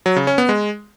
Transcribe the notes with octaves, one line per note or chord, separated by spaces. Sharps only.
F#3
C#3
C#4
B3
G#3